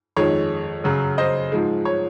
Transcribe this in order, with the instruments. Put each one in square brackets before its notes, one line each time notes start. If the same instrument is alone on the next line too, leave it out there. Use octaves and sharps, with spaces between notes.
[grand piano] F2 D#3 G#3 C#5
F#2 C#3 F#3
C5 D#5
G#2 F3 G#3
C#5